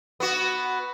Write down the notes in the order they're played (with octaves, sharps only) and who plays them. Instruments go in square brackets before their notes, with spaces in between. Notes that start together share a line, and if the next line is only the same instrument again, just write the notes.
[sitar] B3 F#4